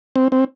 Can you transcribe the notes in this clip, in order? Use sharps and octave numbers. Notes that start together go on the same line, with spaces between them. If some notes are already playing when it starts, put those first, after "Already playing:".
C4
C4